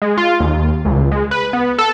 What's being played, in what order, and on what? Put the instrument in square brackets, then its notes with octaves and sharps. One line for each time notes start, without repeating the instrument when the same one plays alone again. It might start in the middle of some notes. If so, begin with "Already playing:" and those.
[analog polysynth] G#3
F4
D#2
C#2
G#3
B4
B3
A4